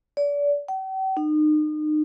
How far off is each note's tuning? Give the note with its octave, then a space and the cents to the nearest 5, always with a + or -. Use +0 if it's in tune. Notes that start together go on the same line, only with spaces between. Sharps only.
D5 -35
G5 -45
D#4 -35